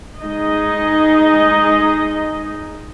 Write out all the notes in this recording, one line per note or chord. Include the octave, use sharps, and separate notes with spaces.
G#3 D#4 D#5